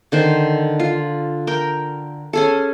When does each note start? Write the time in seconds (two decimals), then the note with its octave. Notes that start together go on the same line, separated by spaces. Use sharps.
0.12 D3 D#3 C5
0.80 F4
1.47 A#4 G5
2.33 C#4 G#4 A4